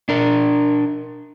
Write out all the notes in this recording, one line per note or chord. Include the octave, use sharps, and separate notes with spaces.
D4 A#4